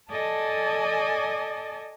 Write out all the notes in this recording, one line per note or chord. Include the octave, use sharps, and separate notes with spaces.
A4 D5 D#5 G#5 A5